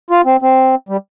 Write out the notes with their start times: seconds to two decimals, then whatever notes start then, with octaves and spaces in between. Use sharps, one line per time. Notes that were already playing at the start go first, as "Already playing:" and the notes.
0.10 F4
0.25 C4
0.42 C4
0.89 G3